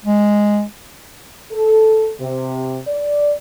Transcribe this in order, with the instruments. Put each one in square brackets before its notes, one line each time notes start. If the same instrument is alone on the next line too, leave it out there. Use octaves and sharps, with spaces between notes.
[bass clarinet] G#3
[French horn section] A4
C3
D5